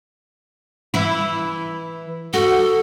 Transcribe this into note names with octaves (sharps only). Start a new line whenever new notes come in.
E3 E4
F#4 A4